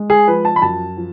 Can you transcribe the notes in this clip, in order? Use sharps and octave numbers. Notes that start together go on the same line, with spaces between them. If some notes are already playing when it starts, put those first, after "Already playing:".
Already playing: G#3
G#4
F3 B4
A5
B5
F#2 A5
F3